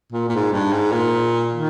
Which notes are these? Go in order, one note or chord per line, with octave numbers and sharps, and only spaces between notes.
A#2
A#2
G#2
G2
G#2
A#2
D#3